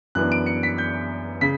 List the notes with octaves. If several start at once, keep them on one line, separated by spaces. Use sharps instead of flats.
F#2 E3 B3 D4 F#6
D7
C#7
B6
G6
C#3 B6